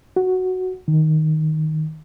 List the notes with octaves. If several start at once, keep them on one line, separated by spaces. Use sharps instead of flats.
F#4
D#3